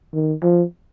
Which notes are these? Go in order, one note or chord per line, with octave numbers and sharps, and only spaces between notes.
D#3
F3